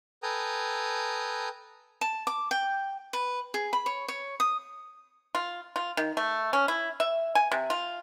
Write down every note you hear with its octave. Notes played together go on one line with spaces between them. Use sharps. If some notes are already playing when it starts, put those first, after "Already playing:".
A4 B4 G5 G#5 A#5 D#6
A5
D6
G5
B4
G#4
B5
C#5
C#5
D#6
F4
F4
D#3
A3
C#4
E4
E5
G#5
C3
F4